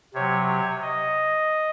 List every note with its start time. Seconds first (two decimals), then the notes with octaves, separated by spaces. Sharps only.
0.14 C3 F#3 C#5
0.48 C#5
0.81 D#5